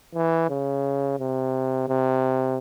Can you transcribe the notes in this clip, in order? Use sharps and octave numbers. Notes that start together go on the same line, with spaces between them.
E3
C#3
C3
C3